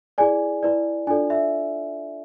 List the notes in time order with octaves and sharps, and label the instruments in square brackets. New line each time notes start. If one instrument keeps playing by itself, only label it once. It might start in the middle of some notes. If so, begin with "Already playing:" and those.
[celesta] E4 G#4 D5 G#5
E4 B4 D5
D4 F4 A4 D5 G#5
E5